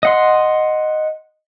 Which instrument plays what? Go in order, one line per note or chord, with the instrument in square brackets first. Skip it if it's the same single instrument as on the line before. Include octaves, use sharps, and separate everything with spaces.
[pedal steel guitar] D#5 F#5 C6